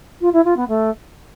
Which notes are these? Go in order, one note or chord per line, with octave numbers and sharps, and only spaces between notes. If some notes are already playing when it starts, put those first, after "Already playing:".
F4
E4
F4
B3
A3